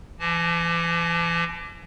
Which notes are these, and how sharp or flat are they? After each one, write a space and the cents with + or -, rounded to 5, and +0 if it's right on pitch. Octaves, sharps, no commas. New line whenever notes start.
E3 +35 A5 -30